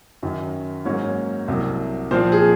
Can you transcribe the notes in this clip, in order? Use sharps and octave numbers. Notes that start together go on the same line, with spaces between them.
F#2 D#3 F#3
G#2 F#3 A#3 C#4 C#5
C2 C3 F#3
A#2 F3 C4 C5
G#4